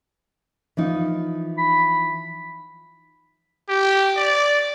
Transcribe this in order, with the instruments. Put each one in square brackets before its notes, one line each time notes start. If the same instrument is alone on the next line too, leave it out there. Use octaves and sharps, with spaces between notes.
[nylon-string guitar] E3 F3 D#4
[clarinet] B5
[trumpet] G4
D5